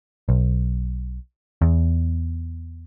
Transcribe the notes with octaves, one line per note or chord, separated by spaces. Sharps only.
B1
E2